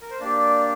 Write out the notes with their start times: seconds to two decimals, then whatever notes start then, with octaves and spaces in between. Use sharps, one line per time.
0.01 A#4
0.10 C5
0.20 A#3 D4 G4 D5